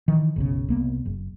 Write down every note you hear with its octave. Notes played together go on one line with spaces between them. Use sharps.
D#3 E3
F#1 B1 C#3
C2 A#3 B3
F#1